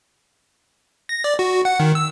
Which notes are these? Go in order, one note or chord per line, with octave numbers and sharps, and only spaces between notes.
A#6
D5
F#4
F#5
D#3
E6